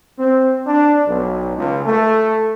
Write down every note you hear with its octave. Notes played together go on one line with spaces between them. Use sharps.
C4
D4
B1
C#2
A3